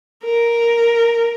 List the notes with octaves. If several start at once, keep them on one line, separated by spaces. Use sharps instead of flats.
A#4